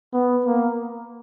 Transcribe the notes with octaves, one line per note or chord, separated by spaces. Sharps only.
B3
A#3